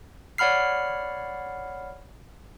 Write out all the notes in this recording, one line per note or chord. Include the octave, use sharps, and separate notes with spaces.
C#5 D5 F#5 B5 F6 C7